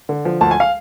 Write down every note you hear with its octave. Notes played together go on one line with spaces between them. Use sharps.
D3
F3
D2 A5
G#5
F5